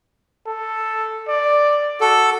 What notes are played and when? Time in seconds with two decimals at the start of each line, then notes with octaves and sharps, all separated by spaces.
0.46 A4
1.28 D5
2.01 F#4 A4